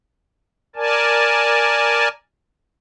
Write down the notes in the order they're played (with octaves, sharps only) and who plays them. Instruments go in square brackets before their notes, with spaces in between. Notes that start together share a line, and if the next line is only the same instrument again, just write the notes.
[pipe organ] A#4 D5 G#5 A5